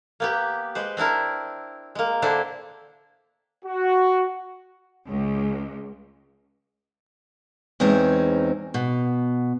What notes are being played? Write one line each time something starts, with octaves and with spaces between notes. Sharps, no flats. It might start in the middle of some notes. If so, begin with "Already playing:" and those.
A#3 B3 G4
G#3 B4 C5
C4 D4 E4 A#4
G#3 A#3
D3 C4 D4 E4 C5
F#4
C#2
E2 G#3 C4 C#4 D#4
B2